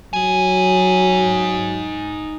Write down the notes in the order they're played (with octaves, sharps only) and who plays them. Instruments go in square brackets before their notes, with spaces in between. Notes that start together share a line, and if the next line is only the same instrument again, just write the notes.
[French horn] F#3 [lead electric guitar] D#4 G#5